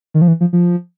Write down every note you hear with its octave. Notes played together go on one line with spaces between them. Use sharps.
D#3
F3
E3
F3
F3